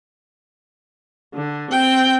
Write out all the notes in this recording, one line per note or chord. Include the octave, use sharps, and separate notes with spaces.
D3
C4 G5